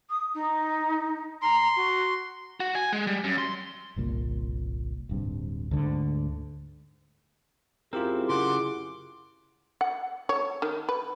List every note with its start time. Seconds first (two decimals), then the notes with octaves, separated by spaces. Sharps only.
0.10 D#6
0.34 D#4
1.42 A#5 C6
1.76 F#4
2.60 F#4
2.75 G#5
2.93 G#3
3.07 G3
3.24 F#2
3.38 C6
3.96 G1 C2 A#2
5.09 D1 G2 C3
5.71 D2 G#2 D3
7.93 F#2 C4 E4 F4 G4 G#4 A#4
8.29 C#3 F#5 C6 D6
9.81 F#5
10.29 C#5
10.62 D#3
10.89 B4